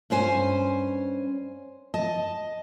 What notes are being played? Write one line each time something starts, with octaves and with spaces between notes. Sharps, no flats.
G2 C#4 C5 G#5
D#5 A5